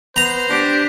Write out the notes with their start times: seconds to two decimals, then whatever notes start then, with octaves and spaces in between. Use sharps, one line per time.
0.16 B3 C5 A#5
0.50 D4 G4